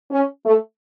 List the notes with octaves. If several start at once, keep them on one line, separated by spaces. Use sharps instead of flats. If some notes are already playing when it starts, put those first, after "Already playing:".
C#4
A3